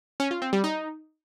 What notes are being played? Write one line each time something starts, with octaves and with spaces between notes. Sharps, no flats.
C#4
F4
C4
G3
D#4